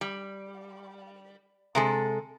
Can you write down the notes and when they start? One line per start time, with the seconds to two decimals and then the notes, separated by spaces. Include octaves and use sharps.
0.01 G3
1.75 C3 G#3 A4